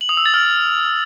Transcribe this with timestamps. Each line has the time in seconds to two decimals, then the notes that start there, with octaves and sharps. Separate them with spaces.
0.01 F#7
0.09 D#6
0.17 E6
0.26 A6
0.34 F6